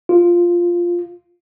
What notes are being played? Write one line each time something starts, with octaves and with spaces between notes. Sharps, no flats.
F4